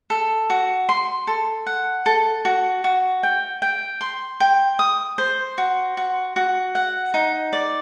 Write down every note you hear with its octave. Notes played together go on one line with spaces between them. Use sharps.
A4
F#4
C6
A4
F#5
A4
F#4
F#4
G5
G5
C6
G5
D#6
C5
F#4
F#4
F#4
F#5
D#4
D5